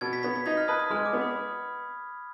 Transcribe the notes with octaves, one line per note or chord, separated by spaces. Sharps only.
B2 G#6
B6
B3 B6
B6
D#4 G#6
F6
B4 D#6
D#6
G#3 F6
D6
B3
B5